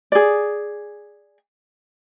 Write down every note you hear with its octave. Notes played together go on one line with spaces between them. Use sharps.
G#4 D5